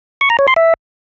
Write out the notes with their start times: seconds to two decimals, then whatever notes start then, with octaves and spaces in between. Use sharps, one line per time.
0.21 C#6
0.30 A#5
0.39 C#5
0.48 C6
0.56 E5